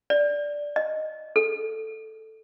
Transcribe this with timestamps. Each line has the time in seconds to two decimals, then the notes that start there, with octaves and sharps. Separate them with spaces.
0.10 D5
0.76 D#5
1.36 A4